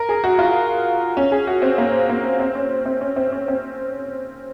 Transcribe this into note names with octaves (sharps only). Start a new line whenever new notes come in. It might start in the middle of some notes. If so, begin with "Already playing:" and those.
Already playing: A#4
G#4
F#4
F4
C#4
G#4
F#4
C4
A#3
A#3
C4
C#4
C4
C#4
C4
C#4
C4